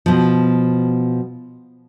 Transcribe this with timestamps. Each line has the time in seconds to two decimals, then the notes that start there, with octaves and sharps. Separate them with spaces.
0.06 B2 F3